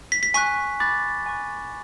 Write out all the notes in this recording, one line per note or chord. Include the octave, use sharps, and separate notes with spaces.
B6
B6
G#5 C#6 F#6 B6
B5 D6 F#6 A6
G#5 C#6 F#6